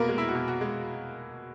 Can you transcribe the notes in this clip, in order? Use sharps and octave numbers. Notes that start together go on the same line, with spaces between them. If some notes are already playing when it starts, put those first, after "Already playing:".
Already playing: B2 A#3 B3 G#4 A#4
G#3
E4
F#4
B2
F#4
G#3